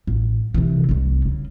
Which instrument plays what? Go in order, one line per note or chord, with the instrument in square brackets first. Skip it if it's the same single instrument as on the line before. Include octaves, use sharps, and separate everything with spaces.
[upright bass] A1
C3 E3
C2 A3
C#3